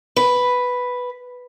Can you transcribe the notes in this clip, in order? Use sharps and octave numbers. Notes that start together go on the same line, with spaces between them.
B4